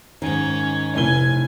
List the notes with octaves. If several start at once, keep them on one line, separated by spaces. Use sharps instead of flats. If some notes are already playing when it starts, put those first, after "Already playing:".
G#2 D#3 C#4
F1 A2 C3 G#5 G7